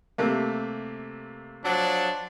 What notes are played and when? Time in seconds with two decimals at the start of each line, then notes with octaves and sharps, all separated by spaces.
0.18 C3 A3 A#3
1.65 F3 F#3 D4 A5